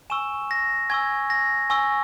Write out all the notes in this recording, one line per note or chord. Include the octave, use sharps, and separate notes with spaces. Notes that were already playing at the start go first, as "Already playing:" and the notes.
G#5 C#6 E6 E7
A#6
G#5 C#6 E6 G#6
A#6
G#5 C#6 E6